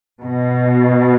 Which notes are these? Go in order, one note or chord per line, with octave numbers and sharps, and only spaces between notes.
B2